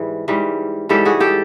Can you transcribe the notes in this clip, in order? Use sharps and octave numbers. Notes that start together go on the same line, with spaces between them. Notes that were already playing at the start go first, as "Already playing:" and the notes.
Already playing: G#2 E3 G3
G#2 E3 G3
G#2 E3 G3 G4 A4
F#4 G#4
G4 A4